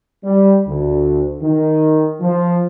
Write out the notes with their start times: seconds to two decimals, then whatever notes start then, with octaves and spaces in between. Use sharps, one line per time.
0.24 G3
0.67 D2
1.42 D#3
2.21 F3